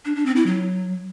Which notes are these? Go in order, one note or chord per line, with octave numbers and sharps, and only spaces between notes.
D4
D4
C4
E4
F#3